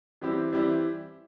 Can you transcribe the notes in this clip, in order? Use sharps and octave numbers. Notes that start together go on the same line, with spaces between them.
E3 G3 C4 E4 G4
E3 G3 C4 E4 G4